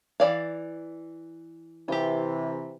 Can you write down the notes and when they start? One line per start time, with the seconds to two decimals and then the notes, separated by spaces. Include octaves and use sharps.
0.20 E3 D5 F5
1.88 C3 E3 F4 G4